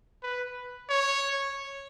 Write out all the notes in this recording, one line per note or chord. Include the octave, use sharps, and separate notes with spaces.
B4
C#5